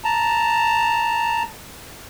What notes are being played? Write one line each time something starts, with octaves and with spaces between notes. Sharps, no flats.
A5 A#5